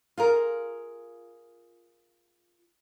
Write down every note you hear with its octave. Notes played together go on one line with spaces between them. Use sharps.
F4 G#4 A#4